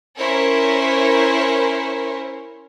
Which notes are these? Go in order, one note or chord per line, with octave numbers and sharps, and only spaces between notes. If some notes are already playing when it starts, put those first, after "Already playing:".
C#4 E4 A#4 C5 C#5